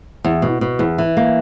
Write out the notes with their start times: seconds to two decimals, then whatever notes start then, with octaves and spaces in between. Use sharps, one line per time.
0.24 E2
0.42 B2
0.61 B2
0.79 E2
0.98 E3
1.17 A#3